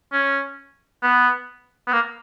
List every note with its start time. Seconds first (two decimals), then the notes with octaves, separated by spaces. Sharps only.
0.13 C#4
1.03 B3
1.87 B3
1.93 A#3